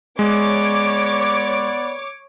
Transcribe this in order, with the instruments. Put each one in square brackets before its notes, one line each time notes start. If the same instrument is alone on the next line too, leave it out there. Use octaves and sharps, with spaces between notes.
[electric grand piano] G#3 [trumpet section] B3 D5 [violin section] C#5 D6